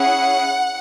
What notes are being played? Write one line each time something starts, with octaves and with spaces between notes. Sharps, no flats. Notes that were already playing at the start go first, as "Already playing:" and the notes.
Already playing: C#4 E4 G#4 F#5